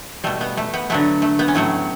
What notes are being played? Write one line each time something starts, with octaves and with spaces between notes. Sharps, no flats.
B2 G3 A3
B3
A3
B3
D3 F#3 A3 B3
A3
B3
C#4
A2 F#3 A3 B3